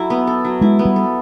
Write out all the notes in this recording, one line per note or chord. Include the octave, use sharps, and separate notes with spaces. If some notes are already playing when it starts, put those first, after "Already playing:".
Already playing: F#3 E4 A4
B3
A4
F#3
G#3 E4
B3
G3
A4